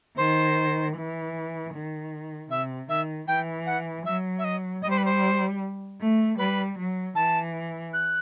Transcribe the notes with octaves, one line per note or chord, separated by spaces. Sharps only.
D#3 C5
E3
D#3
C3 E5
D#3 E5
E3 G5
F#5
F#3 E5
E5
D#5
G3 D#5
C5
B4
C5
A3
G3 B4
F#3
E3 A5
F#6